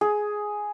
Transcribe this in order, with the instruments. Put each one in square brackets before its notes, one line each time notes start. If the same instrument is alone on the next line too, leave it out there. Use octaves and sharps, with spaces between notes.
[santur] G#4